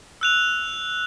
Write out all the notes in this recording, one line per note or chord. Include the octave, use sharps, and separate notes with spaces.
E6 F#6 F7